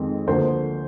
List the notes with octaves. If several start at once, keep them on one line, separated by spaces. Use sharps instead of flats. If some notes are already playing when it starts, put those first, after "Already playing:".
Already playing: F2 D#3 G#3 C4
D2 D3 F3 A#3 C5